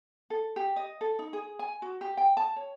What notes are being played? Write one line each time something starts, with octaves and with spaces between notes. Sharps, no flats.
A4
G4
D#5
A4
D#4
G#4
G#5
F#4
G4
G5
A5
C#5